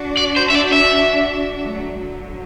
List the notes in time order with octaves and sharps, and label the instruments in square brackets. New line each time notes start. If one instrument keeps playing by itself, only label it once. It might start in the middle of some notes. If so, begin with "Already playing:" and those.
Already playing: [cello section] D4 F#4
[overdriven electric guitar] D5
C5
E5
D5
E5
[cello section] F#3 A3
D3 F#3